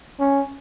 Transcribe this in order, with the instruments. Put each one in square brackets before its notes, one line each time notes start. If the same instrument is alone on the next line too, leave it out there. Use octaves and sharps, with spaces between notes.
[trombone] C#4